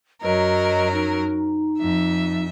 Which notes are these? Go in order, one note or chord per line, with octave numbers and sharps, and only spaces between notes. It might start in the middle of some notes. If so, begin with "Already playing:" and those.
F#2 F#3 A#4 D#5
D#4
F2 E5